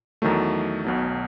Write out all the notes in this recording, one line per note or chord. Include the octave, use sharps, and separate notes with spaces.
E2 D#3 F#3 A3
B1 B2 F#3